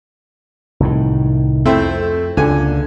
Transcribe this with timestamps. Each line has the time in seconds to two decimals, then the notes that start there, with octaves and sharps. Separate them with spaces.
0.80 C2 A2 D#3
1.65 F2 A3 C4 E4
2.37 C#2 A#2 D3 G#5